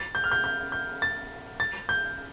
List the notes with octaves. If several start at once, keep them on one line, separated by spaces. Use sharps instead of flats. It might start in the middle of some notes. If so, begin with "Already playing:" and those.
Already playing: A6
G6
F6
G6
G6
G6
A6
A6
G6